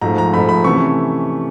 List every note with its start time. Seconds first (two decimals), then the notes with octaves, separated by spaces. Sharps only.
0.01 G#2 F3 A3 A#5
0.18 A#5
0.34 G#2 F3 A3 B5
0.49 B5
0.64 C3 E3 A3 C#4 C#6